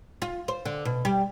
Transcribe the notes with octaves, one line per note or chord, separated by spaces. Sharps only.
F4
C5
D3
B2
G3